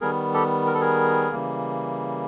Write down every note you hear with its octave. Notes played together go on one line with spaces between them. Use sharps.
D#3 G3 B3 G#4 A#4
G4 A4
A#4
A4
G#4 A#4
C#3 E3 G3 A#3